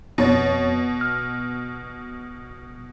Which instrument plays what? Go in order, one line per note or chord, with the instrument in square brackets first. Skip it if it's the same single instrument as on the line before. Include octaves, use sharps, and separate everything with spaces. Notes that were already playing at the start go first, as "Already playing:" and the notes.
[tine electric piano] F2 C#5 A6 [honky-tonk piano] B2
[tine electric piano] F6